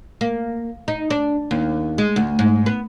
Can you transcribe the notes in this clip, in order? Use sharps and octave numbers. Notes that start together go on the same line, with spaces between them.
A#3
D#4
D4
D#2
G#3
D2
G#2
B3